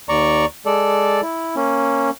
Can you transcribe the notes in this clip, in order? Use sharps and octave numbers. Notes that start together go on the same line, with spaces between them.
D#2 D5 A#5 C#6
G#3 A4 D5
E4
A#3 C#4